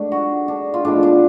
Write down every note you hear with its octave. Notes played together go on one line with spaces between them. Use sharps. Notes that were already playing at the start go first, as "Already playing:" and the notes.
Already playing: G#2 F#3 A3 D4
F#4
D4
F4
A2 F3 G#3 B3 D4
D4